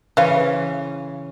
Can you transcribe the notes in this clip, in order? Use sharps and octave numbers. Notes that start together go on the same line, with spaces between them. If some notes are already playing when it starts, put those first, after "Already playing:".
C#3 E3 B4 C5 F5